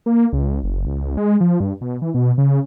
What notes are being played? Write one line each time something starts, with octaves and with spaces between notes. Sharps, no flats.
A#3
C#2
F#1
C#2
G#3
F3
G2
B2
E3
B2
C#3